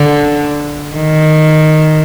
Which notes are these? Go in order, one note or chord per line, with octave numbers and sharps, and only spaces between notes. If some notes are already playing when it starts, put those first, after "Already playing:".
Already playing: D3
D#3